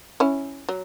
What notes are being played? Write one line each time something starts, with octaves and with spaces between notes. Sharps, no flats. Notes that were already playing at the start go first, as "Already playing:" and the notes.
C#4 E4
F#3